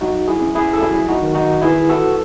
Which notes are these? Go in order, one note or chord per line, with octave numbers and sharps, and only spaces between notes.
F#3 D#4 F#4
E4 G#4
C#4
E4 G#4
A4
F#3 E4 G#4
D#4 F#4
D#3
D#4 F#4
E3 E4 G#4
F#4 A4